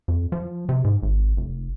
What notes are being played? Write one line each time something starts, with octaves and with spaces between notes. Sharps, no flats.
F2
F3
C3
G#2
G#1
F1